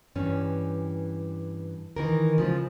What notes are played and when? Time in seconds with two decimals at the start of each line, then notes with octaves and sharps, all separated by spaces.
0.15 G2 E3 C#4
1.96 D#3 E3 A#4
2.38 C#3 F3 G#3